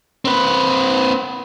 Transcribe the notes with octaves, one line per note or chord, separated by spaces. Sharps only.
C4 B4